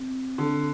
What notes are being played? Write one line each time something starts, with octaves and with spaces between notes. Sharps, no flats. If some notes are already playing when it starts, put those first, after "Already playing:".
Already playing: C3
D3